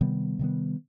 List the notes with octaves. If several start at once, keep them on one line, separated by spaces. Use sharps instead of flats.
C3 D#3 G3 B3
C3 D#3 G3 B3